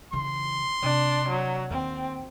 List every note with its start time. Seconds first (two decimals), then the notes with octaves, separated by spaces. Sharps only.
0.13 C#3 E3 C6
0.83 C3 D4
1.30 F#3
1.70 D#2 C4